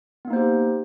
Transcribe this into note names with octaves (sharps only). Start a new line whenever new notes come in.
A#3 B3 D#4 G4 C5